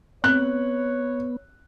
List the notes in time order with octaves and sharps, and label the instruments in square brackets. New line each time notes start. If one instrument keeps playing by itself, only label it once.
[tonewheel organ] B3 [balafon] C4 [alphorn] C#5 [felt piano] F#6